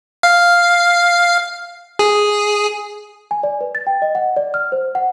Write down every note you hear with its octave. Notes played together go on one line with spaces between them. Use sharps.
F5
G#4
G#5
D5
B4
A6
G5
D#5
F#5
D5
F6
C5
F#5